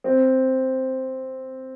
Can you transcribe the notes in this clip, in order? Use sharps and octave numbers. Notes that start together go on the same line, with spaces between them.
C4